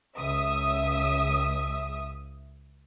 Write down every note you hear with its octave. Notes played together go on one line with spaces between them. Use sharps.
C#2 E5 D#6